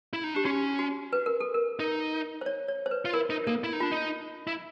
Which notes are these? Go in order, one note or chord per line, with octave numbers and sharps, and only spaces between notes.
E4
D#4
D4 G4
C#4 F#4
F#4
B4
A#4
A4
A#4
D#4
C5
C#5
C#5
C5
B4
F4
E4 A#4
D#4
A#3 A4
E4
D#4
D4 F4
D#4
E4